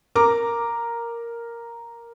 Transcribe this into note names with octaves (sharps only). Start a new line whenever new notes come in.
A#4 A#5 D6